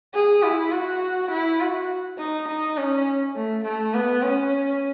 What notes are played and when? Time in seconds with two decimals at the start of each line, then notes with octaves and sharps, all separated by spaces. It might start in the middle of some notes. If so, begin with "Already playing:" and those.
0.14 G#4
0.43 E4
0.72 F#4
1.31 E4
1.60 F#4
2.18 D#4
2.48 D#4
2.77 C#4
3.36 A3
3.64 A3
3.94 B3
4.23 C#4